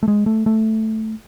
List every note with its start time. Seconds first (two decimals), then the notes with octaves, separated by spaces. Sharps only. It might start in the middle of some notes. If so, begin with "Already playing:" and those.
0.03 A3
0.08 G#3
0.26 A3
0.46 A3